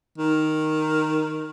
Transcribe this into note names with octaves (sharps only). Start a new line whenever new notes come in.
D#3